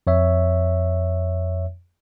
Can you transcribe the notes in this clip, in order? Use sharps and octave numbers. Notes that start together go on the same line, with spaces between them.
F2 C#5 E5